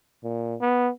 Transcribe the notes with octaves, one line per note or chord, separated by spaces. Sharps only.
A#2
B3